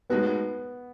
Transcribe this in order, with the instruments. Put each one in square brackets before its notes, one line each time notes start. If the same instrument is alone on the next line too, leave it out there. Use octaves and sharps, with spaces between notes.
[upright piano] A2 G#3 D#4 F#4 [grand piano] B3